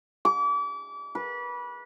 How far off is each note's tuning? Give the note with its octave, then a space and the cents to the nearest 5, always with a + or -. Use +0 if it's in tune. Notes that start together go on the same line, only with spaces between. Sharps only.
D6 -35
B4 -25